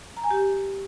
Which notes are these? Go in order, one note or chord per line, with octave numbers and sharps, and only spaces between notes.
A#5
G#5
G4